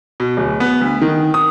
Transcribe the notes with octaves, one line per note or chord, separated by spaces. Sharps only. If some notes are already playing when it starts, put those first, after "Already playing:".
B2
D1
B3
D2
D#3
D#6